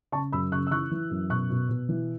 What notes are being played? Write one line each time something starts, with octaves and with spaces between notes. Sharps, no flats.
C#3 A5 C#6
F#2 B5 E6
C#3 C#6 F#6
E6
E3 C#6 F#6
E3
F#2
B2 C#6 F#6
B2
B2
E3